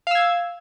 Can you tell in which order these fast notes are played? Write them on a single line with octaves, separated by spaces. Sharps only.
F5 E6 G#6